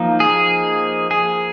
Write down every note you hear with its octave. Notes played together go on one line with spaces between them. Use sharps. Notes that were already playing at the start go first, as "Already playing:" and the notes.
Already playing: F3 A#3 D#4
G#4
G#4